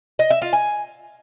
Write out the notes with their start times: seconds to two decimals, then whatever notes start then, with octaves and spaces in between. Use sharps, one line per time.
0.19 D#5
0.30 E5
0.42 F4
0.53 G#5